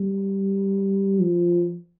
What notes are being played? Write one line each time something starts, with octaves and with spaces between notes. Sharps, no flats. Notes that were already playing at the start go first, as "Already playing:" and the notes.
Already playing: G3
F3